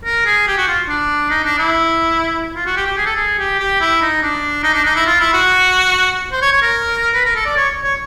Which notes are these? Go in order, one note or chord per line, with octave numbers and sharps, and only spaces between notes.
A#4
G#4
G4
F#4
F4
D4
D#4
D4
E4
F4
F#4
G4
G4
G#4
A4
G#4
G4
G4
E4
D#4
D4
D#4
D4
D#4
E4
F4
E4
F#4
C5
C#5
C#5
A#4
B4
A#4
A4
D5
C#5
C#5